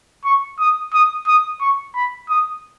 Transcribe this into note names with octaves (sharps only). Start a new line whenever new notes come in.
C#6
D#6
D#6
D#6
C#6
B5
D#6